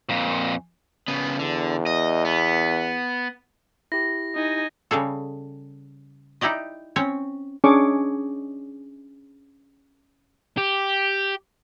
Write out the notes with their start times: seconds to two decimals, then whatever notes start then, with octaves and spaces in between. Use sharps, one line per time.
0.09 F2 A#2
1.08 C#3 B3
1.39 E2 D3
1.86 D#5
2.25 B3
3.92 E4 G4 A#6
4.35 D#4 G#5
4.91 C#3 G3 G#4 A4
6.41 D#4 E4 G4 D5 D#5
6.96 C4 C#4 C#5
7.64 C#4 D4 G#4 C#6 D6
10.58 G4